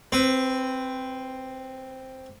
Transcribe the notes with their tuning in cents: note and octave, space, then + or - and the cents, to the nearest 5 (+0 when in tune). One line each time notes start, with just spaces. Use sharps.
C4 +0 B4 +25